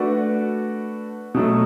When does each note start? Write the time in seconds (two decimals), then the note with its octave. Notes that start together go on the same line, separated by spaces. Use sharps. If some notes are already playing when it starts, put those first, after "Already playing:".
Already playing: A3 D4 F#4 B4 D5
1.34 B2 F#3 A3